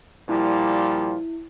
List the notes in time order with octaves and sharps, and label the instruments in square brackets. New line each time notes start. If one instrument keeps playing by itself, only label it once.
[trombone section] A#2 F3 G3 [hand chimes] E4